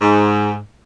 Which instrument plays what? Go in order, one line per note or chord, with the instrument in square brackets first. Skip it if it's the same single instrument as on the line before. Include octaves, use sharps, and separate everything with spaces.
[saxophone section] G#2